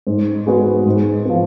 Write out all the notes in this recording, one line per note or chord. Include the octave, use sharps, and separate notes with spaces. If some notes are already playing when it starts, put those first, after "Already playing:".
G#2
G#3 B3 F#4 B4
G#2
F3 B3